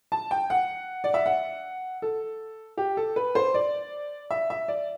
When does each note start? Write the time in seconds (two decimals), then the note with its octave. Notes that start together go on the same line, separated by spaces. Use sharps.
0.12 A5
0.31 G5
0.50 F#5
1.04 D5
1.14 E5
1.26 F#5
2.02 A4
2.78 G4
2.97 A4
3.16 B4
3.35 C5
3.54 D5
4.31 E5
4.50 E5
4.68 D5